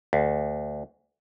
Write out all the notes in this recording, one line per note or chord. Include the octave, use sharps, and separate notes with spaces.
D2